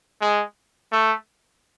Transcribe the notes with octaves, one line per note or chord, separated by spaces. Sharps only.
G#3
A3